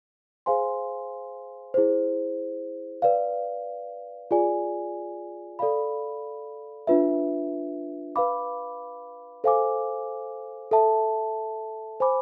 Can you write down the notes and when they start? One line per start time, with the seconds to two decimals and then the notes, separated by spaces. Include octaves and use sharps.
0.46 G#4 C5 F5 G#5 C6
1.74 E4 G#4 C5
3.02 B4 D5 F5
4.31 F4 G#4 D5 G#5
5.59 A4 D5 F5 B5
6.87 D4 F4 B4 E5
8.16 B4 F5 B5 D6
9.44 A4 C5 F5 G#5 D6
10.71 A4 E5 A5
12.00 C5 G#5 B5 D6